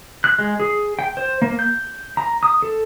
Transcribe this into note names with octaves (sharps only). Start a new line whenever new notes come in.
F#6
G#3
G#4
G5
C5
A#3
G6
A#5
D#6
A4